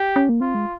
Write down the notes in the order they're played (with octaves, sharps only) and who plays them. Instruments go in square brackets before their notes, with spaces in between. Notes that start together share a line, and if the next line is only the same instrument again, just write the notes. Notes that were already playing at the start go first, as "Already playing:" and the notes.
Already playing: [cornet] G4
[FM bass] C#4
A#3
[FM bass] C4 [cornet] F4
[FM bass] G#3